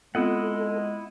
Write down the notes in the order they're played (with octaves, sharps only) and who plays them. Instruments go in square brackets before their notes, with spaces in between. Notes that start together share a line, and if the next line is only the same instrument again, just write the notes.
[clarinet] G#3 [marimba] B3 C4 F4 [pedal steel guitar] E4 D#5 F#5 [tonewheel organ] A4